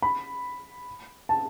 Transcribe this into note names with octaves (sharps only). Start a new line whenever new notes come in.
B5
A5